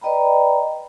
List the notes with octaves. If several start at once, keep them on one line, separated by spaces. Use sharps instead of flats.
B4 D5 D#5 G5 A#5 B5